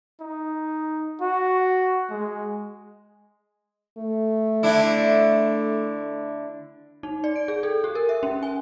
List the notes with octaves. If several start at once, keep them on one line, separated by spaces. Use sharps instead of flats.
D#4
F#4
G#3
A3
D3 D4 E4
D#4
D5
D7
G#4
A4
G4
A#4
E5
C#4
G#5